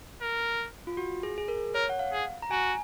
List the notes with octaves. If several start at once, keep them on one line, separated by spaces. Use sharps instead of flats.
A#4
F4
F#4
G#4
G#4
A#4
A#4 C#5
F#5
F5
G#4
A#5
F#4 G#5